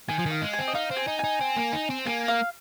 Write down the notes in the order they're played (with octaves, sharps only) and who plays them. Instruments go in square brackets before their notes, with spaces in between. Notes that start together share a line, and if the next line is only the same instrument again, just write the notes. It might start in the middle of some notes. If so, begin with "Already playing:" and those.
[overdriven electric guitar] D#3 [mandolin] G#5
[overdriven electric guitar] F3
[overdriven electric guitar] D#3 [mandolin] F5
[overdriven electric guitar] G#3
[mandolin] G#5
[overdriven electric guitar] C4
[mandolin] D#5
[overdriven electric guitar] D#4 [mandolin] F5
[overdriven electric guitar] C4
[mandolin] G#5
[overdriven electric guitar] D#4
[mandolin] G#5
[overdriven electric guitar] D#4
C4
A#3
D#4
C4
[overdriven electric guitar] A#3 [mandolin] G#5
[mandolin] F5